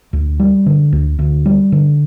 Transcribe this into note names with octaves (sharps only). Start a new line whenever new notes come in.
D2
G3
D3
D2
D2
G3
D3